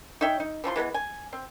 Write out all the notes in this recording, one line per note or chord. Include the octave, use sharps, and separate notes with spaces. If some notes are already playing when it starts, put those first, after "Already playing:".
D#4 C#5 E5 G5
D#4
E3 F3 A#5 C6
E3 G#3 A#3 B3
G#5
C4